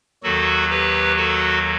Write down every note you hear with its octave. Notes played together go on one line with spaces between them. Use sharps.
D#2 D#3 F#3 F#4 A4
G4 B4
F#4 A4